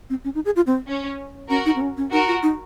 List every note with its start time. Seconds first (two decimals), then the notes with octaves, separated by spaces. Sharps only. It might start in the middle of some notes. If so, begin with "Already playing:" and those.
0.10 C4
0.25 C#4
0.35 D#4
0.45 G#4
0.56 F4
0.67 C4
0.87 C#4
1.49 C#4 F#4 A#4
1.66 D#4
1.76 C4
1.81 C#4
1.97 C#4
2.12 D#4 F#4 A#4
2.27 F4
2.43 D#4